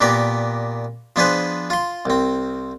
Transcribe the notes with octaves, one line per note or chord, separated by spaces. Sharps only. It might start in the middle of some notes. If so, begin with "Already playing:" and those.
A#2 A#3 B3 G4 D5
F3 B3 D4 G#4 B4 C5
F4 C6
C2 C4